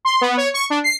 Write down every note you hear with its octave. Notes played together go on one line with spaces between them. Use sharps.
C6
B3
C#5
C#6
D4
C7